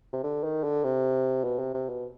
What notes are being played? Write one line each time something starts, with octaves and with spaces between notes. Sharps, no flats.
C3
D3
D#3
D3
C3
B2
C3
C3
B2